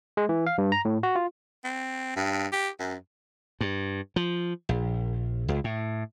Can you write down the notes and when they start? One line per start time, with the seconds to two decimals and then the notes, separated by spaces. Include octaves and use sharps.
0.17 G#3
0.29 E3
0.47 F5
0.58 G2
0.72 A#5
0.85 A2
1.03 F#4
1.16 F4
1.64 C4
2.16 G2
2.52 G4
2.79 F#2
3.61 G2
4.16 F3
4.69 A#1
5.48 C#2
5.64 A2